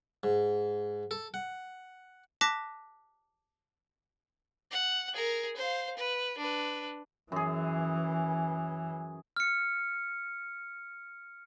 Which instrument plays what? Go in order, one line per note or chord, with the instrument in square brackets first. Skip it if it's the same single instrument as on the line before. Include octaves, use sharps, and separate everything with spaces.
[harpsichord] G#2
A4
F#5
[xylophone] A5 D6 F#6 A#6 B6
[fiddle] F#5
G#4 A#4
C5 F5
B4
D4 B4
[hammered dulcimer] F#2 G#4 [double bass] E3
[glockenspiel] F6 C#7